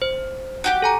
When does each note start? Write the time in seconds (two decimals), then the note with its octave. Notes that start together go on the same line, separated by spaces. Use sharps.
0.02 C5
0.64 F#4 G4 G5
0.82 A4 G#5 A#5